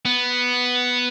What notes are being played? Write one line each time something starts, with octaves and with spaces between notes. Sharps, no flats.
B3